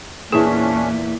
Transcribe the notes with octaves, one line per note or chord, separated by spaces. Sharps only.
E2 A#2 C#4 D4 E4 G#4